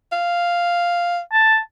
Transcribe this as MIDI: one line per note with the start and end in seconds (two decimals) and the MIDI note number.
0.12 1.20 77
1.33 1.58 81